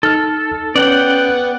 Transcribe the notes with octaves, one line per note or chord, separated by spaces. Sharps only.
D#4 A4 F6
B3 C#4 D5 F#5 G5